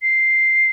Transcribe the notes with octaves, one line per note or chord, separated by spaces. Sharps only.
C7